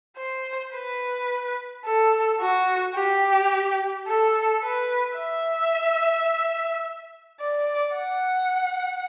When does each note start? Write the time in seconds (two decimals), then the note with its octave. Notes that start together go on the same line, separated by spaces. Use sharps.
0.17 C5
0.74 B4
1.85 A4
2.40 F#4
2.95 G4
4.07 A4
4.63 B4
5.18 E5
7.40 D5
7.96 F#5